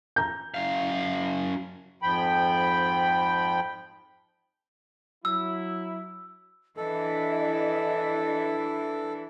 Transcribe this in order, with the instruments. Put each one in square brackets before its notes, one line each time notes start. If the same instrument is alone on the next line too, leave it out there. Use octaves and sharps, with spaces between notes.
[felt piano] A#5 G6
[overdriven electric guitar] F#2 F5
[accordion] F2 G#2 F3 G5 B5
[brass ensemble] F#3 E4 [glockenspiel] E6
[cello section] E3 D4 E4 [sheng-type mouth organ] A4 [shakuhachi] D#5